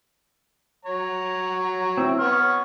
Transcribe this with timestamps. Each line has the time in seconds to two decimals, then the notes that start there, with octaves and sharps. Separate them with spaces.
0.85 F#3 C#5 A#5
1.97 C4 E4
2.19 B3 C#5 C#6 F6